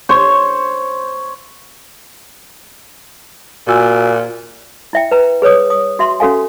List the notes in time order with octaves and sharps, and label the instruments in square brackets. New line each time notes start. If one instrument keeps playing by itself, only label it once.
[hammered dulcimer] C5 C#5
[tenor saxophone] A#2 [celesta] F#4 G#5 E6
[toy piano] E4 E5 G5
B4 A#5
G#4 B4 C#5 D#6
D#6
F#4 E5 C6
C#4 F#4 A4 F5 G#5